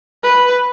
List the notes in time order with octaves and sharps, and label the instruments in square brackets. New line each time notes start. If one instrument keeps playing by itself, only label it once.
[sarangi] B4